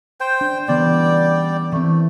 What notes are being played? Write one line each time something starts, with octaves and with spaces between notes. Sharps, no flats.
C5 G5
D4
C#3 E3 G3 B3 D5 G5
E3 A3 C4